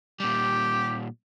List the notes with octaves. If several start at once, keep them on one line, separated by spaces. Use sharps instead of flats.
A#2 G3 G4